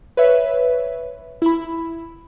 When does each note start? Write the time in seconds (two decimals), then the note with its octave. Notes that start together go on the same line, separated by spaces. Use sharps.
0.17 B4 C#5 E5
1.42 E4 B5